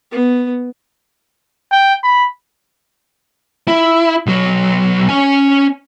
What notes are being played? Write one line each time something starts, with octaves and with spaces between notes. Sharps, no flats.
B3
G5
B5
E4
B1 F#3
C#4 G#5